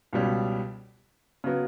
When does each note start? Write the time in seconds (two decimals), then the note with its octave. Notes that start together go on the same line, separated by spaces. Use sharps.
0.13 C#2 B2 G3 C#4
1.44 C#3 F#3 B3